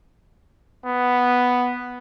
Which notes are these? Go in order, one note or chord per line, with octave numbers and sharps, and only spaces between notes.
B3